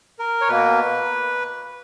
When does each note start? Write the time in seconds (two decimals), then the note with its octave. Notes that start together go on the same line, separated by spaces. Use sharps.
0.19 A#4
0.41 C#5
0.48 B2 A#3 B4